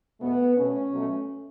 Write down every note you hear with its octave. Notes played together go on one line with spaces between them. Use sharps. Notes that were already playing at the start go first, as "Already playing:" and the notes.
E2 B2 A3 B3
B2 A3 C#4
B2 F#3 A3